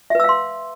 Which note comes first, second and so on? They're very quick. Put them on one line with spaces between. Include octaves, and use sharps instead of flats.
E5 B4 E6 F5 C6